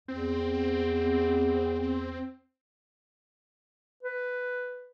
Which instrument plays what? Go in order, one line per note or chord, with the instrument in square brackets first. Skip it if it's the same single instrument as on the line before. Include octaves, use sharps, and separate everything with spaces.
[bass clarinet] E2 [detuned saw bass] C4
[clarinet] B4